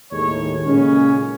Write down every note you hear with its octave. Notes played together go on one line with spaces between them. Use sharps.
D#2 A2 G#3 D#4 A4 C#5
A#2 C#3 G#3 C#4